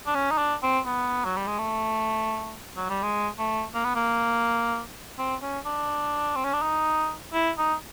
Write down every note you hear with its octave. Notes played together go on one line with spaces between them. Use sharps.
D4
C#4
D#4
D4
C4
B3
F#3
G3
G#3
A3
F#3
G3
G#3
A3
A#3
B3
A#3
C4
C#4
D4
C4
C#4
D4
D#4
E4
D#4